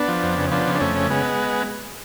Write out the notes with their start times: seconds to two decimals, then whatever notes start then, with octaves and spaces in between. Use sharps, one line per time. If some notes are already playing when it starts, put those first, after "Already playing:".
Already playing: B3 D4
0.08 F3
0.23 F2
0.38 C#3
0.51 F3 B3 D4
0.66 C#3
0.75 D4
0.80 F2 A3 C#4
0.95 C#3
1.10 G#3 B3